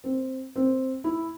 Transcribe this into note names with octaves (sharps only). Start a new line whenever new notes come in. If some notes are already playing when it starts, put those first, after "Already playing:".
C4
C4
E4